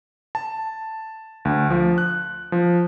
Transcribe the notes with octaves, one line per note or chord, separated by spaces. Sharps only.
A5
D2
F3
F#6
F3